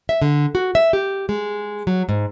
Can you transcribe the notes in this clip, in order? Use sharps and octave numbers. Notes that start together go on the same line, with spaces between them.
E5
D3
F#4
E5
G4
G#3
F#3
G#2